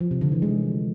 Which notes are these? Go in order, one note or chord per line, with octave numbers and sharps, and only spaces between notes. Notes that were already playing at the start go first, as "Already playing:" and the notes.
F3
C3
D3
E3
G#3